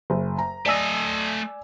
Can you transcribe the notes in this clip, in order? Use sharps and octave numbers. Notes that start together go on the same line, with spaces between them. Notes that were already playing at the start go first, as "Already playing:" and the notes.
F#1
A#5
A3 D5 D#5 G#5 E6